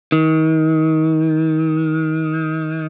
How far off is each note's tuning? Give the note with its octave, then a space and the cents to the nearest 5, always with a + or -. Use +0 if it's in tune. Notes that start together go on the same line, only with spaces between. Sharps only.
D#3 +30